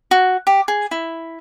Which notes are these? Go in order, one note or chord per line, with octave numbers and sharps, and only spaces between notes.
F#4
G4
G#4
E4